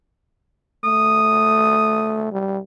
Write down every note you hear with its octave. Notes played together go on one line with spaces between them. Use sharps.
A3 D#6
G3